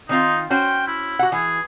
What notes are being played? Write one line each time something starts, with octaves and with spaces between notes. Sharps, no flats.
D#3 C4 D#4 F4
C#4 F#4 C5 G5
E4
F#4 F#5
E3 G#4